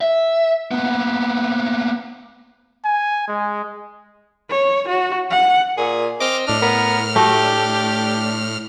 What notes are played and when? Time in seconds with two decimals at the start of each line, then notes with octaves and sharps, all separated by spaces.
0.01 E5
0.71 A#3 B3
2.84 G#5
3.28 G#3
4.50 C#5
4.89 F#4
5.31 F#5
5.78 A#2 G#4
6.20 C4 D#5 D6 F6
6.47 A2 D4 F6
6.62 B3 A#4
7.16 A3 F#4 G4
7.43 D4